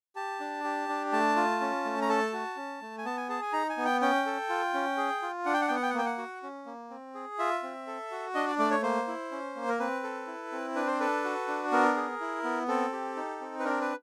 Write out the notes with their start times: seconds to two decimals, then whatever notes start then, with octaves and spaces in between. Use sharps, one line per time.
0.16 G4 A5
0.40 D4
0.64 G4
0.89 D4
1.12 A3 A5
1.36 F4
1.61 C#4
1.85 A3
2.02 A#5
2.09 A4 A5
2.33 F#4
2.56 C#4
2.82 A3
2.98 G#5
3.05 B3 A5
3.17 G#5
3.29 G#4 A5
3.42 G#5
3.53 D#4 A#5
3.69 G#5
3.77 B3
3.85 G5
4.01 C#4 G5
4.26 A4
4.50 F4
4.74 C#4
4.97 G#4
5.22 F4
5.46 D4 F#5
5.53 G5
5.61 F#5
5.68 B3 G5
5.75 F#5
5.83 G5
5.90 F#5
5.94 A#3 G5
6.05 F#5
6.18 F#4
6.43 C#4
6.66 A#3
6.90 C4
7.15 G#4
7.39 F4 E5
7.63 C4
7.87 A4
8.11 F#4
8.35 D4 D#5
8.47 D5
8.59 A3 D5
8.71 C#5
8.82 A#3 C5
9.08 E4
9.32 C#4
9.56 A#3
9.69 A#4
9.80 C4 B4
10.03 A4
10.27 E4
10.52 C4
10.75 D4 B4
10.87 C5
11.00 A4 B4
11.24 F#4
11.48 D4
11.72 B3 A#4
11.96 G#4
12.21 E4
12.44 B3
12.68 C4 A4
12.92 G4
13.16 D#4
13.41 C4
13.59 B4
13.64 D4 A#4
13.81 B4